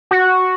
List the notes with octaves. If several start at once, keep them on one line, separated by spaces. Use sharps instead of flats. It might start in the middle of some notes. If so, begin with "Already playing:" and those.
F#4